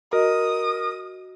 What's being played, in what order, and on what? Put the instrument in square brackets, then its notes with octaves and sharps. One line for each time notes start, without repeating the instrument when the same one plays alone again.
[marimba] F#4 D#5 [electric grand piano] A#4 [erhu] D#6